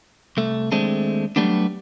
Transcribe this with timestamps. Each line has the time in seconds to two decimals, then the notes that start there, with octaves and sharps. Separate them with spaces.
0.37 C2 A3
0.72 D#2 G#3 A3 C4 D4
1.36 F#3 G3 A3 B3 D4